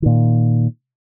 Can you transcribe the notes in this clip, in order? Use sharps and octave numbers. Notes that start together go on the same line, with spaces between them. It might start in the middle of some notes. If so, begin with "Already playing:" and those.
A#2 D#3